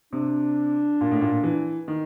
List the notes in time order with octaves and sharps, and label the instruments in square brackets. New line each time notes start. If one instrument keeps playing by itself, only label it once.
[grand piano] C3 [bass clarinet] D4
[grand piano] A#2
A2
A#2
E3
D#3